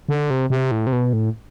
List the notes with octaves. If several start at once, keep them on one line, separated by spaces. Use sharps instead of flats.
D3
C3
C3
A2
C3
B2
A2